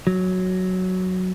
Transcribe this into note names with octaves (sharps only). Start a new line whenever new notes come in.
F#3